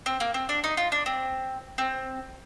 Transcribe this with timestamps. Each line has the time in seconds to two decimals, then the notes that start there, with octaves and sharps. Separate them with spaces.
0.06 C4
0.20 A#3
0.34 C4
0.49 D4
0.64 D#4
0.77 F4
0.92 D4
1.06 C4
1.78 C4